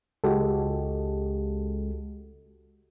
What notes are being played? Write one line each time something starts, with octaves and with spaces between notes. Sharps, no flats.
C#2 G#3 F#4 G4 A4